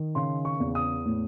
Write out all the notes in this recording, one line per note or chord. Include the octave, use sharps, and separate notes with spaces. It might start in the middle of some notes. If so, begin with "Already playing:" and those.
Already playing: D#3
C#3 C6
C#6
E2
D#6
A2